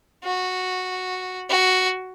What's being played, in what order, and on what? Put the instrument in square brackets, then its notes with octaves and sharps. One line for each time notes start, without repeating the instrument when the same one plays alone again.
[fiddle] F#4
F#4